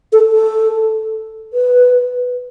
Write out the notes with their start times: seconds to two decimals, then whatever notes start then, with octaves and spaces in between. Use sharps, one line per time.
0.13 A4
0.33 A4
1.53 B4